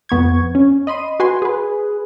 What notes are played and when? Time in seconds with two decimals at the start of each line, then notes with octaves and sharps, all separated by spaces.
0.09 F2 B3 C#6 G#6
0.55 C#4
0.87 D#5 B5 C6 D#7
1.20 F#4 B4 G#5 C6
1.42 G#4 B4